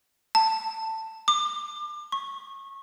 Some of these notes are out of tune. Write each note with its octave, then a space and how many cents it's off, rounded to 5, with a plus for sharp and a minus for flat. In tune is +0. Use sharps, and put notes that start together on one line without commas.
A5 +15
D6 +30
C#6 -20